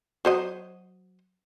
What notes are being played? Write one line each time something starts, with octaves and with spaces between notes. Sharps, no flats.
F#3 C5 D#5